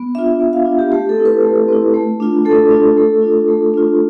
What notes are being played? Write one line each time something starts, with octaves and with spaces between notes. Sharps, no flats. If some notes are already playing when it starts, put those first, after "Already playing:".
Already playing: B3
D4 F4 E5
B3
F5
D4 F4
G4
A3 G4
A4
C4 E4
B4
A3
C4 E4
A3
D4 F4
A3 A4
D4 F4
A3
D4 F4
A3
D4 F4